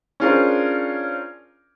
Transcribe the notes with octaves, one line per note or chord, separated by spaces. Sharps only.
C#4 D4 F4 G#4 A#4 C5